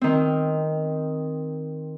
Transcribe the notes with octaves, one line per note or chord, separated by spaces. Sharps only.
D#3 C4